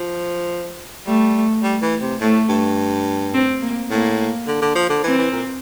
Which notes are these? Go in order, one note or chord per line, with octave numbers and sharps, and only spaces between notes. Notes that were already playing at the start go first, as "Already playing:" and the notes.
Already playing: F3
G3 A3
G3
E3
C3
A2 A3
G2
C4
A#3
A2 A#3
D3
D3
F3
D3
E3 C4
E3
A#2